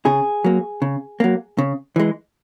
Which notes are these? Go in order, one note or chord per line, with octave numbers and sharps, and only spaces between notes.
C#3 G#4
F#3 A#3
C#3
F#3 A#3
C#3
E3 G#3